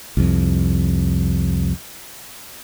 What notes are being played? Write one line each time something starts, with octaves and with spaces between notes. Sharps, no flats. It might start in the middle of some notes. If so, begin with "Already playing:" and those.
C2 F2